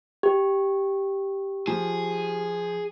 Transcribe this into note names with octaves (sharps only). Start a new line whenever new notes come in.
G4
F3 G#4